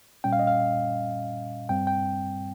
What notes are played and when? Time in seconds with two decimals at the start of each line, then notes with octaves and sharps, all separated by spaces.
0.24 A#2 G3 C#4 G5
0.33 F5
0.39 D#5
0.47 F5
1.69 G2 G3 C4 G5
1.87 G5